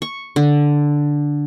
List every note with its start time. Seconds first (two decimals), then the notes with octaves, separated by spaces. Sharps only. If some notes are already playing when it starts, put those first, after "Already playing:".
0.02 C#6
0.36 D3